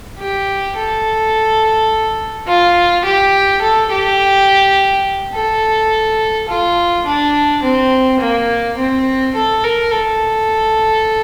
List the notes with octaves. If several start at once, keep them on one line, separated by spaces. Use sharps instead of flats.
G4
A4
F4
G4
A4
G4
A4
F4
D4
C4
A#3
C4
A4
A#4
A4